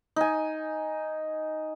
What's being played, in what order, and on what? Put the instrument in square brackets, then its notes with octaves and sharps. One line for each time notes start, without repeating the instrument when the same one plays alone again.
[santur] D#4 G#5